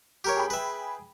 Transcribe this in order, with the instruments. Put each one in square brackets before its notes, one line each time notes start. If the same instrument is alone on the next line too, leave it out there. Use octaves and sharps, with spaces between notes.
[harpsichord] G4 A#4 C#5
[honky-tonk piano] G#4 G5 B5
[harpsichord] B4 E5